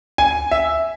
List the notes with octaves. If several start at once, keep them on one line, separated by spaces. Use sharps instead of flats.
G#5
E5